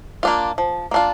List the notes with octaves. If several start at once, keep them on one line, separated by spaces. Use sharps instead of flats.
A#3 D4 F4
F3
A#3 D4 F4